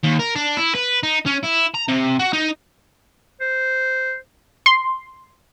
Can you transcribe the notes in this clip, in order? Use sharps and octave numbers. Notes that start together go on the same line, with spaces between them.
D#2
A#4
D4
E4
B4
D#4
C#4
E4
A#5
C3
F#4
D#4
C5
C6